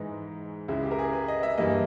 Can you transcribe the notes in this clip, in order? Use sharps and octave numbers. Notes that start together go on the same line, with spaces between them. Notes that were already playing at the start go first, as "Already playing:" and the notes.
Already playing: G#2 E3 G#3 D#4
C#2 C#3 G#3 E4
G4
A#4
G#4
B4
D#5
E5
G2 E3 G3 A#3 D#5